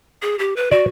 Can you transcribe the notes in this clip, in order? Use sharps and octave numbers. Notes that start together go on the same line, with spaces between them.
G#4
G4
B4
F#4 D5